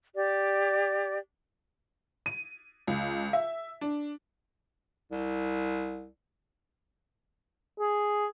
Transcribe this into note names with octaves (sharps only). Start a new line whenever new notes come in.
G4 D5
D#7
C#2
E5
D4
C2
G#4